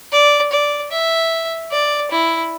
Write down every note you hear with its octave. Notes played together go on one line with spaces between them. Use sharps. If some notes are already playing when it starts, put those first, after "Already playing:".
D5
D5
E5
D5
E4